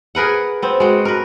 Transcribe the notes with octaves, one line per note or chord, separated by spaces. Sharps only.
G#4 A#4 B4 F#5
B3 C4
G#3 F#4
A#4 B4